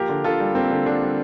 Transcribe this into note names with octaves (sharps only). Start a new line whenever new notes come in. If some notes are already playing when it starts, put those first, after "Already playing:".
Already playing: F3 A#3 G4 A#4
D3
D3 F4 A4
G3
A#3 C4
D3
D3 D4
G3